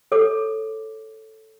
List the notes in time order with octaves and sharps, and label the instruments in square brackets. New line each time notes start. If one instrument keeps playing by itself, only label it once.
[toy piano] A4 C#5 D6